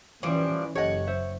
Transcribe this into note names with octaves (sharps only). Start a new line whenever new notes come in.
E3 F3 G3 C#4 D4
F#1 G4 A4 C#5 D#5 F#5
C5 E5